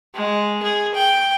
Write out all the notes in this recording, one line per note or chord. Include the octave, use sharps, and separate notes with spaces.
G#3
G#4
G5